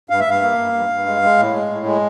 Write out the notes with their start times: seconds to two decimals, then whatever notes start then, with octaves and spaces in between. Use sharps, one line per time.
0.10 G2 F5
0.20 E5
0.26 G2 F5
0.42 A#3
0.58 G2
0.73 G2
0.90 G2
1.06 G#3
1.22 G#3
1.38 A2
1.54 G#3
1.69 A2
1.86 G#3